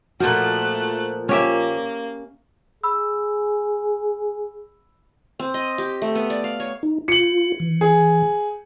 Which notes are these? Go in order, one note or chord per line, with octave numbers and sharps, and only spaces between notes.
A#2 F3 A3 F#4 F#6
A#3 C#4 G4 E5
G#4 B5 E6
C4
D#5
G4
A3
B3
D5
F5
C#5
D#4
F4 C#7 F#7
E3
G#4